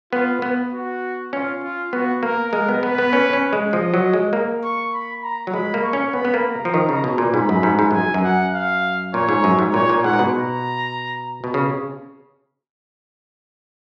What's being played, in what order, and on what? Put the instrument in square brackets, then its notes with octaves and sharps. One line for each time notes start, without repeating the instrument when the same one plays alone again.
[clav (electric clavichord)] B3 [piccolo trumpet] F4
[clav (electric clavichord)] B3
[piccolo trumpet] F#4
[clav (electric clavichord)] C#4 [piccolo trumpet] F4
[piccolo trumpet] F4
[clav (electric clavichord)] B3 [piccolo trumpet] F#4
[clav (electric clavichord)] A#3 [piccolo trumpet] A#4
[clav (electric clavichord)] G#3 [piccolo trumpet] A#4
[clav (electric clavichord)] B3
[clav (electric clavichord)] B3 [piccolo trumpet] B4
[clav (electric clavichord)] B3
C#4
C#4
G#3
[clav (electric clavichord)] F3 [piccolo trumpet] D#5
[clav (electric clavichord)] F#3
G#3
A#3
[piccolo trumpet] C#6
B5
A#5
[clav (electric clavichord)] F#3
[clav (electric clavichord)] G#3 [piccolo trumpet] B5
[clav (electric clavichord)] A#3
[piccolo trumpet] C#6
[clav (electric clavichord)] C#4
[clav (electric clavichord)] B3 [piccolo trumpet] B5
[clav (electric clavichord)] B3
A#3
[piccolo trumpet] A#5
[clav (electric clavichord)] F3
D#3
C#3
B2
A#2
[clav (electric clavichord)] G#2 [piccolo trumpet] B5
[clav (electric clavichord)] F#2
G#2
G#2
[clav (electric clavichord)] F#2 [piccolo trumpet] G#5
[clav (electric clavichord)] F#2
[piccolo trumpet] F#5
F5
[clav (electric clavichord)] A#2 [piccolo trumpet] C#5
[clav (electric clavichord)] G#2
F#2
G#2
[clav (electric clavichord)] A#2 [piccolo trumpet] C#5
[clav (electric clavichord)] A#2
[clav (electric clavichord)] G#2 [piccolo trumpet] F#5
[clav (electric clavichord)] A#2
B2
[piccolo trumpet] A#5
[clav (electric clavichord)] B2
C#3